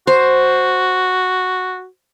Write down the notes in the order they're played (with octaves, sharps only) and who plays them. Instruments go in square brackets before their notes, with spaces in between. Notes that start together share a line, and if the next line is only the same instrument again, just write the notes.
[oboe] F#4 [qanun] C5